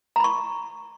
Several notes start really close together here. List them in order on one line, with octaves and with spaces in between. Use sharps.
A#5 B5 C#6